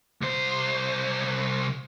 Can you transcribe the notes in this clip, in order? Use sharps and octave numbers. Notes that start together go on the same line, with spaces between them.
C2 C5